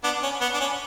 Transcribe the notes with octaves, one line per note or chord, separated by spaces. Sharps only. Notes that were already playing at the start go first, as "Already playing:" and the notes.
B3 D4
C#4
B3
D4
C#4